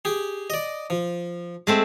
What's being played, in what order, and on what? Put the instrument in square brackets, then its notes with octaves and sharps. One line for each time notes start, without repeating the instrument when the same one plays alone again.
[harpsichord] G4 G#4
D5 D#5
F3
[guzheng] G#3 A3 C4